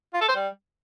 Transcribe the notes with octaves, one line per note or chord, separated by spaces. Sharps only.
F4
A4
C5
G3